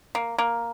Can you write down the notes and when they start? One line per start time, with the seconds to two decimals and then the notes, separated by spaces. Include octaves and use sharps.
0.15 A#3
0.39 A#3